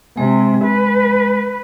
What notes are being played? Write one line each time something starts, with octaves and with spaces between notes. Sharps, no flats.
C3 G#3
B4